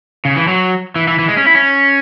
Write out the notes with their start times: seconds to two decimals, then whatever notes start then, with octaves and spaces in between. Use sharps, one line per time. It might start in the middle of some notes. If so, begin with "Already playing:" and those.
0.25 C#3
0.36 E3
0.48 F#3
0.96 E3
1.08 E3
1.19 E3
1.28 G#3
1.37 C#4
1.46 E4
1.55 C#4